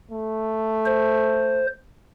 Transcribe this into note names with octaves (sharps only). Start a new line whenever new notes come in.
A3
C5